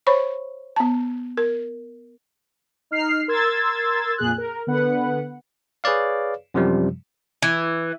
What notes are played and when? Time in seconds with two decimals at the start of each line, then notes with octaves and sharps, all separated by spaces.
0.07 C5 C#5 B5 C#6
0.76 B3 A5
1.37 A#4
2.91 D#4 F6 C7
3.28 A#4 C6 E6 G#6 A6
4.18 F2 A#2 G#4 F#6
4.38 A#4
4.67 D3 B3 B4 F#5
5.84 G#4 B4 C#5 D5 F5
6.54 F#2 C3 F3 G3
7.42 E3